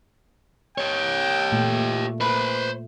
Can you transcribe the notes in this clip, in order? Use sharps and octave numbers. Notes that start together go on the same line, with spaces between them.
G4 C#5 G5
A#2 A3
B4 C5 B5